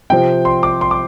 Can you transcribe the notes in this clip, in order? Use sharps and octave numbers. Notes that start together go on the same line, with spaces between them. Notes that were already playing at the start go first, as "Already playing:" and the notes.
C3 F3 C4 G5
C6
D6
C6
D6